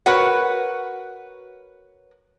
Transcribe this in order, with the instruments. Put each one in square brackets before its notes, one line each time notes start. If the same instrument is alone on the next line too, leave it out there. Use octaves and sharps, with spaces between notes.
[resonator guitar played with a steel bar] F#4 A#4 B4 C#5 F#5